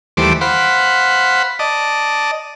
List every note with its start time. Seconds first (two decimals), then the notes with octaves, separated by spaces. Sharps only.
0.17 D#2 E3 G3 A3 C5 D6
0.41 C5 F5 F#5 B5
1.59 D5 D#5 A5